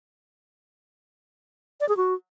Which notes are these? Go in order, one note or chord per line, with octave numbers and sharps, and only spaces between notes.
D5
G#4
F#4